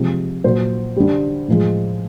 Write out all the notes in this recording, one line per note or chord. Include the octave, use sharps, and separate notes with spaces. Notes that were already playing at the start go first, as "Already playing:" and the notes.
Already playing: C3 F3 G#3
A#2 F#3 C5
D3 G3
A2 F3 G#3